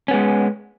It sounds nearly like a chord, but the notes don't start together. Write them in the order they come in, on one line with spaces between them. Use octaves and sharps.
C#4 B3 G#3